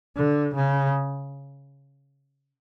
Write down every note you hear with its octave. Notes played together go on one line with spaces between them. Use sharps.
D3
C#3